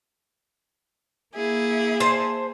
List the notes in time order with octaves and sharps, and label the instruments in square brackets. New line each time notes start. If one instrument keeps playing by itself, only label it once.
[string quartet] A#3 E4 G#4
[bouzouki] C5 A5